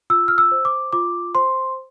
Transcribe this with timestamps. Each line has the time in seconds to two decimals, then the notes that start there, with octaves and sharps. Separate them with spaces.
0.10 F4 E6
0.28 F6
0.38 E6
0.52 C5
0.65 D6
0.93 F4 D6
1.35 C5 C6